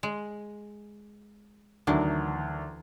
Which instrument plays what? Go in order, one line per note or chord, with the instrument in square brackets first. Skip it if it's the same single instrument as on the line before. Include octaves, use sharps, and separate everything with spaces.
[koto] G#3
[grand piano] D2 D#3 F#3 [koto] E3 D4